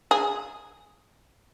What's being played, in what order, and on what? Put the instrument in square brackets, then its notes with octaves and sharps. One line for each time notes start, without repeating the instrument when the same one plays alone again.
[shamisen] G#4